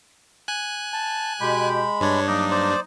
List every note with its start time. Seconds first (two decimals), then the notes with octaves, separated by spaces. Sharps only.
0.48 G#5 F#6
0.93 A5
1.41 B2 G#3 G4 B5
2.01 G2 D4 C#5
2.28 F#3 A#3 D#4 D6
2.50 C5 D5